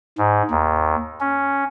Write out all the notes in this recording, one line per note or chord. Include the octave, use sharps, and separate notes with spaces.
G#2
D#2
C#4